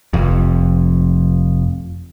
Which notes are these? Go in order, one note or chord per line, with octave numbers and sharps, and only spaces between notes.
F1 F2